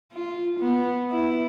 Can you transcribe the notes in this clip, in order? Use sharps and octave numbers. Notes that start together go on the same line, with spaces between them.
F4
B3
E4